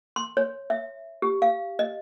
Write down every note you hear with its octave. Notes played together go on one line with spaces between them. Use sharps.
C6
C#5
E5
G4
F5
D#5